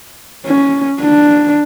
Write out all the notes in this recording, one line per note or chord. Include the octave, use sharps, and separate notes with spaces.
C#4
D4